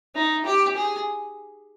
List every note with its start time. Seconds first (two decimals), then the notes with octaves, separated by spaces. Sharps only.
0.15 D#4
0.45 G4
0.76 G#4